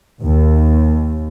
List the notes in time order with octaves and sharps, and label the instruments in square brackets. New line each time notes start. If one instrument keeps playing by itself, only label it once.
[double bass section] D#2